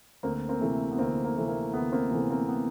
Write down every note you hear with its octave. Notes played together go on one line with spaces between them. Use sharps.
D2 A#3 C4
A#3 C4
C3 E3 A3
B3
D2 A#3 C4
A#3
C3 E3 A3
A#3
D2 B3
A#3 C4
C3 E3 A3 B3
A#3 C4
B3